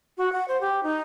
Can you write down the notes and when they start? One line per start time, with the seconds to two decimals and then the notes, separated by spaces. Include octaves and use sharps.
0.18 F#4
0.32 F#5
0.48 C5
0.61 G4
0.83 D#4